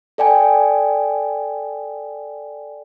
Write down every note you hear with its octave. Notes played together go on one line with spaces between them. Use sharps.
A4 D5 G5 G#5